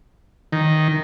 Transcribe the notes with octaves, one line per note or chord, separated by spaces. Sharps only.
D#3